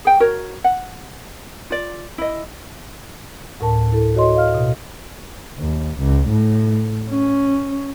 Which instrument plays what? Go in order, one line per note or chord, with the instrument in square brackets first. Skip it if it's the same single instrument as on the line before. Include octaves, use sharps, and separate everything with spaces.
[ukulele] G#4 G5
F#4 A#4 C#5
F#5
F4 D5
E4 D#5
[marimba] D2 A2 A#4 A5
E4 A4
F#4 C#5 D#5 C6
D#5 F5 F6
B2
[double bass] D#2
C#2
A2
C#4